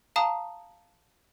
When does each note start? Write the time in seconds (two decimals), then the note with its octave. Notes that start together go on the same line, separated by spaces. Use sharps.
0.16 F5 A5 A#5 D#6